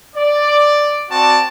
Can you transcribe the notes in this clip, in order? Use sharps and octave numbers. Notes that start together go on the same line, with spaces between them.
D5
C4 F#4 D5 A5